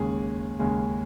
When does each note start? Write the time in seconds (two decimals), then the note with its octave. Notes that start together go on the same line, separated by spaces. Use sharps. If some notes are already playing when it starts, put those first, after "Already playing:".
Already playing: D#2 C#3 G#3 C#4 G#4
0.59 D#2 C#3 G#3 C#4